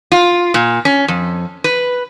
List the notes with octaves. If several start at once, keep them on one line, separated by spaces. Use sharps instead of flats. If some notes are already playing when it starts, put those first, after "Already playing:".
F4
A#2
C#4
F2
B4